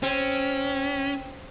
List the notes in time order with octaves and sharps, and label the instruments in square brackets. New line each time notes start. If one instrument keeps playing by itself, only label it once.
[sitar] C4 [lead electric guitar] C#4